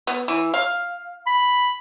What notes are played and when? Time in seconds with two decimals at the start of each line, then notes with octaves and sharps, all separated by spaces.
0.07 B3
0.28 E3
0.54 F5
1.27 B5